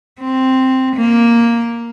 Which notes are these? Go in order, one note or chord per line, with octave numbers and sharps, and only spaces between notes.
C4
A#3